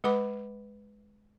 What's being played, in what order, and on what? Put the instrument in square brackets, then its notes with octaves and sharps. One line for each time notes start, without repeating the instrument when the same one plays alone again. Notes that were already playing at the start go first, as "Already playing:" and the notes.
[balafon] G#3 B4 F#5 B5 D6